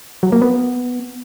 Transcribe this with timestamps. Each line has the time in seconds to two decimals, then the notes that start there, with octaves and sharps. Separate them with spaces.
0.23 F#3
0.32 A#3
0.42 B3